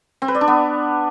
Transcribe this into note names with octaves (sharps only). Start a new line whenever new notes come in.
C4
B4
D5
D4
B3